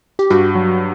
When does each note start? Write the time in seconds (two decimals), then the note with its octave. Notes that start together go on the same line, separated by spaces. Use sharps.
0.19 G4
0.30 G2 F#4
0.55 F#3